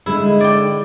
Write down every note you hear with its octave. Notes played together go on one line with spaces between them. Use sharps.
D3 G#3 D#4 E4
D5 G5